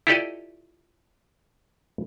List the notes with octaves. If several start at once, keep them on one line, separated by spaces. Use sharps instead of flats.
E4 F4 G4 A4 D5 D#5